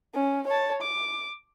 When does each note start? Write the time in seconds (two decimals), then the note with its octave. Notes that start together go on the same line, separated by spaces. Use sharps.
0.14 C#4
0.47 C#5 A5
0.81 D6